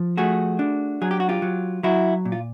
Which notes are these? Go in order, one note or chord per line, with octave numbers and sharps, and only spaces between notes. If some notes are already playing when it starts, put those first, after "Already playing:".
Already playing: F3
A3 F#4 G#4
D4
F#3 G#4
G4
F#4
F4 G4
F#3
F#3 E4 F#4
A#2
F4